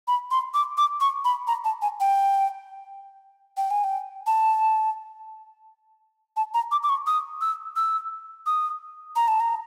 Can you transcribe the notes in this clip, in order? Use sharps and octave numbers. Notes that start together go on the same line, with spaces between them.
B5
C6
D6
D6
C#6
B5
A#5
A5
G#5
G5
G5
G#5
G5
A5
A5
A#5
D6
D6
C#6
D#6
E6
E6
D#6
A#5
A5
A#5